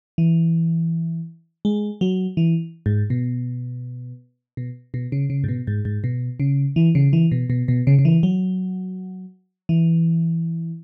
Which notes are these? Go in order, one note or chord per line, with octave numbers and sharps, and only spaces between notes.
E3
G#3
F#3
E3
G#2
B2
B2
B2
C#3
C#3
G#2
B2
G#2
G#2
B2
C#3
E3
C#3
E3
B2
B2
B2
C#3
C#3
E3
F#3
E3